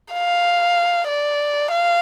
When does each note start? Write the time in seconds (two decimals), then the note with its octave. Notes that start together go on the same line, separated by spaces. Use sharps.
0.13 F5
1.08 D5
1.71 F5